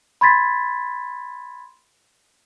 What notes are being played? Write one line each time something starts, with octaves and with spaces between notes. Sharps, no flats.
B5 C6 G#6 A6 B6